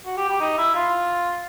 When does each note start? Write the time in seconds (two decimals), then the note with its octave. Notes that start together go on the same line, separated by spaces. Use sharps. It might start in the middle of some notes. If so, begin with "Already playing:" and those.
0.06 F#4
0.17 G4
0.29 G4
0.40 D#4
0.58 E4
0.75 F4